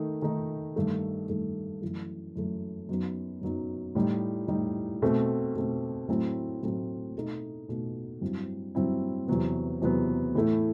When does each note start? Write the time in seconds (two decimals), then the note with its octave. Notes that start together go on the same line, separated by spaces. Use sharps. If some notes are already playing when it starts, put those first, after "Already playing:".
Already playing: D#3 A3 D#4
0.22 D#3 A3 D#4
0.76 G2 D#3 A3
1.28 G2 D#3 A3
1.82 F#2 E3 A3
2.36 F#2 E3 A3
2.89 F#2 F#3 B3 D#4
3.41 F#2 F#3 B3 D#4
3.95 A2 G3 D#4
4.48 A2 G3 D#4
5.02 B2 A3 C4
5.55 B2 A3 C4
6.08 A2 F#3 A3 C4 E4
6.62 A2 F#3 A3 C4 E4
7.15 B2 A3 D#4
7.69 B2 A3 D#4
8.21 G2 F#3 C4 E4
8.75 G2 F#3 C4 E4
9.28 E2 C3 F#3 B3
9.82 E2 C3 F#3 B3
10.35 A2 E3 A3 E4